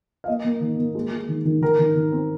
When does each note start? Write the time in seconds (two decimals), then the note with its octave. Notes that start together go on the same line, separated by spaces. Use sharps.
0.24 F5
0.27 A#3 D#5
0.45 A#3
0.61 D#3
0.78 A#3
0.95 G#3
1.12 G#3
1.29 D#3
1.45 D#3
1.62 D#3 A#4
1.79 D#3
1.95 D#3
2.12 C4